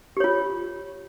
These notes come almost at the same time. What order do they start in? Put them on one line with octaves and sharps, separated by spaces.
G4 C#5 F4